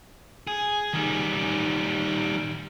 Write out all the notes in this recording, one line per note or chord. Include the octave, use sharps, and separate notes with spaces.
G#4
D#3 G3